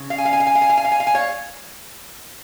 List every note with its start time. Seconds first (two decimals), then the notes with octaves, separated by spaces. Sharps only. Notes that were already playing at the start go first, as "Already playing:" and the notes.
Already playing: C#3 C#4
0.10 F5
0.18 G#5
0.25 F5
0.33 G#5
0.40 F5
0.47 G#5
0.55 F5
0.62 G#5
0.70 F5
0.77 G#5
0.85 F5
0.92 G#5
1.00 F5
1.07 G#5
1.15 C#5 F5